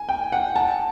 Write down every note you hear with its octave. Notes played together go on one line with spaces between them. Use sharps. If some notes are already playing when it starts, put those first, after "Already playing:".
Already playing: G#5
G5
F#5
A5